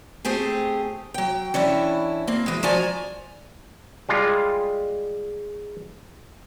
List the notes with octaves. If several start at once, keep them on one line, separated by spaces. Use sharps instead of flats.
A3 C4 G4 G#4
F#3 G5
E3 C#4 D4 E4
A#3 C4
E3 G#3
F3 F#4 D5 D#5 G#5 A#5
G3 G#3 F4